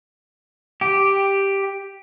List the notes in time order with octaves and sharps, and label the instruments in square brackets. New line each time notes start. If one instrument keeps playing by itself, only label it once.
[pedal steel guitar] G4